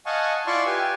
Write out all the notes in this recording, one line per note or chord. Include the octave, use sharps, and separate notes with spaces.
D#5 F5 F#5 G#5 A5 C#6
E4 F4 D5 E5 C6 C#6
G4 B4 G#5